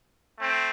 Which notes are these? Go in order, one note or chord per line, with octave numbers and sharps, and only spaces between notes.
A3 C4